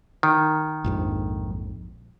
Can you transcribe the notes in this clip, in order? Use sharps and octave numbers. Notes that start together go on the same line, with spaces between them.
D#3
A#1 F2 G#2